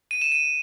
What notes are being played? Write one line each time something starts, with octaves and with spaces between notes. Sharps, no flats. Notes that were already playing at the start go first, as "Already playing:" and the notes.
D#7
E7
D#7